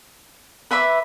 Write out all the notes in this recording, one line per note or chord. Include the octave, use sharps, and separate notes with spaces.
B4 E5 B5 D6